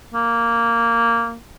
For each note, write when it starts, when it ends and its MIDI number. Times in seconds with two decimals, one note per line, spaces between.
0.14 1.37 58